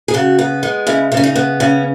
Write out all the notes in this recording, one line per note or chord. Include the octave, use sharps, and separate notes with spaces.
G#4
C#3 F#4
B3
G#3
C#3 E4
C#3
C#4
D#4
B3
C#3 C#4